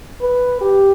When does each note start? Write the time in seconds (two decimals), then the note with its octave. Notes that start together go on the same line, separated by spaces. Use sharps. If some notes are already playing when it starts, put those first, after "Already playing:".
0.21 B4
0.61 G4